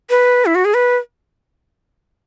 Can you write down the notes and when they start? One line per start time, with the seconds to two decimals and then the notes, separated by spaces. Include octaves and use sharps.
0.10 B4
0.46 E4
0.55 F#4
0.65 G#4
0.74 B4